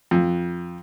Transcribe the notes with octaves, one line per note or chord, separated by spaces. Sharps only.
F2